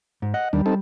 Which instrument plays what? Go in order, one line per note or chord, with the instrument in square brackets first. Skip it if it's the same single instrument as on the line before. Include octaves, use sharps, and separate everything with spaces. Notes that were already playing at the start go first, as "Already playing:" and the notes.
[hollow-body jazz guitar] G#2
[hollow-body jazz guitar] D#5 [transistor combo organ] F#5
[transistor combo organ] D#2 D4 [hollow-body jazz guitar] G3
[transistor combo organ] C4 D#4 A4